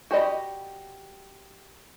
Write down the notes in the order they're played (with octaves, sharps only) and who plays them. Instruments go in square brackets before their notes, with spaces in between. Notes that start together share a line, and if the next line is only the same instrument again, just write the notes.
[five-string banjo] F#4 G4 D5 D#5 B5